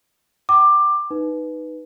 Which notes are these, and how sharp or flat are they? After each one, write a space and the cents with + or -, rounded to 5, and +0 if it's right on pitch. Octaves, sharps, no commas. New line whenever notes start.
G5 -40 D6 +15
D#4 -5 B4 +0